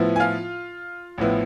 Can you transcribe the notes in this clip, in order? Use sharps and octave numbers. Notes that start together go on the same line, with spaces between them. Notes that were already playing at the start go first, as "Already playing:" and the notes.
Already playing: A2 F3 B3 E4
G#5
F4 F5
A1 A2 F3 B3 E4